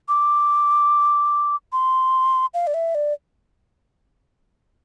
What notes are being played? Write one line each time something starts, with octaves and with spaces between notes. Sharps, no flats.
D6
C6
F5
D5
E5
D5